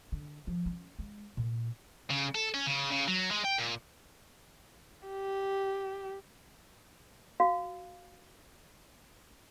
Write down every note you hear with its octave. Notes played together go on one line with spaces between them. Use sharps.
D3
F3
C#4
G#3
A#2
C#3
A4
C#4
C#3
C#3
F#3
G#3
G5
A#2
G4
F#4 F5